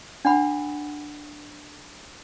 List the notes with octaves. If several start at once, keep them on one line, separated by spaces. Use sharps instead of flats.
D4 F#5 B5